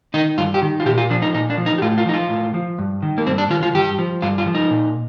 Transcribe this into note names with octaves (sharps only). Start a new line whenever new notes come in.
D#3 D#4
G2 F4
G4
D#3
F4
A#2 G4
F4
F3 D4
D#4
A#2 D#4
D4
F3
D#4
G4
A2 F4
F4
F3 D#4
F4
A2
F3
G2
D#3
A#3
G2 C4
D4
D#3 F4
F4
G2 G4
F3
G2 F4
F4
F3
D#4
A#2